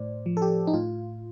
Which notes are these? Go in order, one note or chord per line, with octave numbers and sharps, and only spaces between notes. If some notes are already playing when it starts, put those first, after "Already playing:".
Already playing: A2 C5 D5
F3
A4
G4
D#4
A2 F4